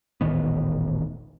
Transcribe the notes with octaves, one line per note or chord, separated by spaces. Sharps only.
D#1 A1 D#3 B3